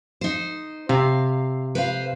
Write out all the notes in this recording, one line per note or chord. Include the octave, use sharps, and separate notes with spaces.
D#4 C5
C3 F5
B4 C5 F5